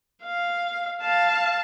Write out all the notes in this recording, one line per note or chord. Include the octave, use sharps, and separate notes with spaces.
F5
F5 A5